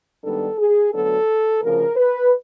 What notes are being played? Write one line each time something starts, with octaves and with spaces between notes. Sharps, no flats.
G#2 D#3 G3 B3 D4 A4
G#4
D2 D3 F#3 B3 D4 A4
D2 C#3 F3 A#4
B4